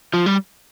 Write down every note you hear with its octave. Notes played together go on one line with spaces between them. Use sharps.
F3
G3